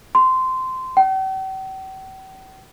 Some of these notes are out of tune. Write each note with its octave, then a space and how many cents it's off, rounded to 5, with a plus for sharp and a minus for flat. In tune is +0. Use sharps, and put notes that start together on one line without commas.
C6 -15
G5 -45